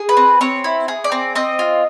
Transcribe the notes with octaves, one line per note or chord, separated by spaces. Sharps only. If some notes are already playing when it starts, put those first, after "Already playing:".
Already playing: G#4
B4
C4
C4 C#5
E4
G#4
D5
C4
C4 D#5
F4